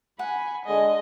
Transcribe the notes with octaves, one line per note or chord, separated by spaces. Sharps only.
F#5 G#5 B5
D3 G#3 D#5 G#5